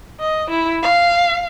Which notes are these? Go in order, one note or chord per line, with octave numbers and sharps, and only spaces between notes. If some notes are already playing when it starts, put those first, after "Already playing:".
D#5
E4
F5